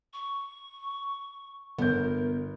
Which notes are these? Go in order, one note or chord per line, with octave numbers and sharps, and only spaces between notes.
C#6
G1 B3 A#4 G6